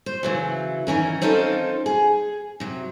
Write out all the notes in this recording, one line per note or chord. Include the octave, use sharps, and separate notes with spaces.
C5
C#3 E3 F#3
D#3 E3 C#4 A#4
C4 C#4 D#4 F4 A4 A#4
G#4
C3 F#3